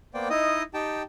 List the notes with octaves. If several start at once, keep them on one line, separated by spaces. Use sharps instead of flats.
A#3 B3 C5 D5 G5
D#4 E4 D#5 D#6
D#4 G4 G5 A5